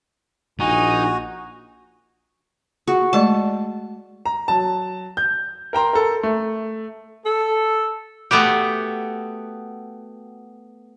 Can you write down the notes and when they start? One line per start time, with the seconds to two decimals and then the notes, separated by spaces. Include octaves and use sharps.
0.60 A#1 D#4 F#4 G#5
2.88 F#4 G#4
3.13 G#3 A3 D5 A5
4.26 A#5
4.48 F#3 A5
5.17 G6
5.73 A#4 G5 A#5 C6
5.93 A4 A#4
6.23 A3
7.26 A4
8.31 A3 B3 F#4 G4